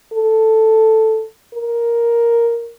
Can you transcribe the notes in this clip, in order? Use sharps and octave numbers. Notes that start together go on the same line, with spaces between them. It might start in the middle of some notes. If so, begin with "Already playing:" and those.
A4
A#4